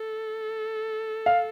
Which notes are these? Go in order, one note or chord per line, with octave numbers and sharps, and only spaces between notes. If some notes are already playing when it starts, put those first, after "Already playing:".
Already playing: A4
F5